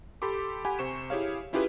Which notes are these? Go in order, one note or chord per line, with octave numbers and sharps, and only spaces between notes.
G4 A4 B5 C6 D6
G4 F#5 G#5 B5
C3 C5 C#6 E7
E4 G4 G#4 C#5 F5
C#4 E4 F4 G4 G#4 B4